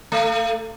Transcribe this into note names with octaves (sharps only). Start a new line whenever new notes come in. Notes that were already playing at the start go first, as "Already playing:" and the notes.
A3